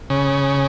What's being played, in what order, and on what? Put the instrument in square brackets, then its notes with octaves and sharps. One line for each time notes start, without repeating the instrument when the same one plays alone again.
[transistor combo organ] C#3